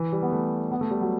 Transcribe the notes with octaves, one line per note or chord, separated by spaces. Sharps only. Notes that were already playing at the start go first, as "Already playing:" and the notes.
Already playing: E3
G3
B3
A3
B3
A3
G3
F#3